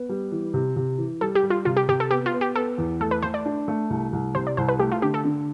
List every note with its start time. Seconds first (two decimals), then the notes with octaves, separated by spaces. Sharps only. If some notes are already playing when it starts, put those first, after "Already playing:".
Already playing: B3
0.09 G3
0.32 E3
0.54 C3
0.76 C3
0.98 E3
1.21 G3 A4
1.35 G4
1.43 G3
1.50 F4
1.65 C3 F4
1.77 G4
1.88 C3 G4
2.00 A4
2.11 B3 G4
2.26 F4
2.33 B3
2.41 G4
2.56 B3 A4
2.78 E2
3.00 A3 A4
3.11 B4
3.22 A3 C5
3.34 D5
3.46 D4
3.68 A3
3.90 C2
4.13 C2
4.35 C3 C5
4.47 D5
4.57 C2 C5
4.69 B4
4.79 A3 G4
4.92 F4
5.02 D3 G4
5.14 A4
5.25 D3